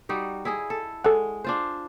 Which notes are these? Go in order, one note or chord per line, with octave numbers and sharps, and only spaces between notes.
G3 D#4 F#4
E4 G#4 D#5
A4
G#3 A4 D5 F#5
D4 F4 C5